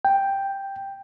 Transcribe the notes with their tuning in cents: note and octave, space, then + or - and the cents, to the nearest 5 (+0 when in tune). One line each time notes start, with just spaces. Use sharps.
G5 +5